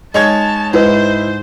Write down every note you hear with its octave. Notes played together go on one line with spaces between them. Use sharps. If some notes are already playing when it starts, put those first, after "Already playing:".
G#3 D#4 C#5 A5 G#6
G#2 E4 B4 C5 D#5